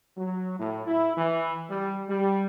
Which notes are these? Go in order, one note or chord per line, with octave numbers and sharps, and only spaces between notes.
F#3
A2
E4
E3
G3
G3